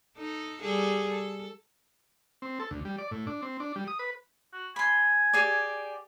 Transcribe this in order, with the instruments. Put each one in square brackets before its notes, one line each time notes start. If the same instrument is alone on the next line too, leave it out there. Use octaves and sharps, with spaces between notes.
[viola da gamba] D#4 A4
G3 G#4 A4
A4
[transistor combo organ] C4
A4
D2
G3
D5
A2
D4
C4
D4
G3
D#6
B4
[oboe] F#4
[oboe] G#5 [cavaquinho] B5 C6
[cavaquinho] G4 G#4 D5